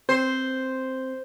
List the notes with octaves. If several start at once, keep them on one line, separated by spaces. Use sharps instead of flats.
C4 C5